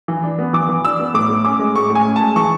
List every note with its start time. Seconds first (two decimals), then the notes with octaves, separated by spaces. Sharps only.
0.08 E3
0.23 D4
0.39 B3
0.53 E3 D6
0.69 E3
0.85 D4 E6
0.99 B3
1.14 A2 D6
1.30 A2
1.45 C#4 D6
1.59 G#3
1.76 A2 C#6
1.90 A2
1.95 G#5
2.05 C#4
2.16 G#3 A5
2.36 E3 C#6